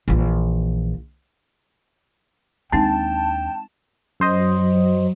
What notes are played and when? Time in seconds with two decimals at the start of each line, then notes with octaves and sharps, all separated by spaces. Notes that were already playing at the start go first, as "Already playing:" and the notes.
0.08 A#1 E3
2.72 D#2 G#3 C4 D4 D#4 G5 A5
4.20 F#2 F#3 C5 D#5